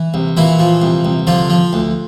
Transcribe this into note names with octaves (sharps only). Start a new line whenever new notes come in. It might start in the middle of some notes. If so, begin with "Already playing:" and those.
Already playing: E3 E4
C2
A#2 E3 E4
F3
C2
C2
D3 F3 F4
F3
D2